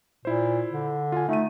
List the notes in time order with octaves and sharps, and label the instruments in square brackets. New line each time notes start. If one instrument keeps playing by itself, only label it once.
[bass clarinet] A#2 [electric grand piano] E4 C5
[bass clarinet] D3
[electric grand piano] F4 G#5
[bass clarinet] A3 [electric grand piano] D#4 D#7